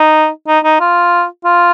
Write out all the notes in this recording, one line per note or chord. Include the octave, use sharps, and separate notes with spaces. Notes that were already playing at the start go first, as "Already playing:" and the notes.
Already playing: D#4
D#4
D#4
F4
F4